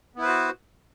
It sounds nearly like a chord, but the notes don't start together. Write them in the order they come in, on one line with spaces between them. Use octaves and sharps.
B3 E4 B4 C5 F#4